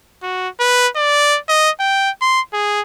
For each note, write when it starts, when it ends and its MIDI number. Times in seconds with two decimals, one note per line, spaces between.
0.23 0.49 66
0.60 0.88 71
0.96 1.39 74
1.49 1.70 75
1.80 2.11 79
2.22 2.41 84
2.53 2.81 68